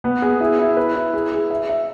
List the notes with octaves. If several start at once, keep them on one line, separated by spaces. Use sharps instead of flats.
B3
G#4
E4
E4
B4
E4
G#4
G#4
E5
E5